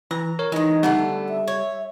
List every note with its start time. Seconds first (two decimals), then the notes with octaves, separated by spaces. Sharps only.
0.11 E3 A#5
0.39 A#4 C#5
0.52 D#3 E3 G#3 D#4
0.83 D3 G3 A3 B3
1.29 E5
1.48 C#5